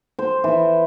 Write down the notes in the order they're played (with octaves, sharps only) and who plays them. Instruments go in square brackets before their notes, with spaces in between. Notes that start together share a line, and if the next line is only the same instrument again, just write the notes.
[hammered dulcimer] C5
E3